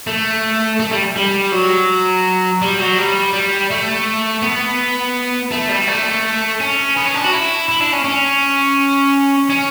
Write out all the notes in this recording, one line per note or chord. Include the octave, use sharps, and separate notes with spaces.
A3
A3
G3
G3
F#3
G3
F#3
G3
G3
A3
B3
A3
G3
A3
C#4
B3
C#4
D4
F#4
E4
E4
D4
C#4
C#4
C#4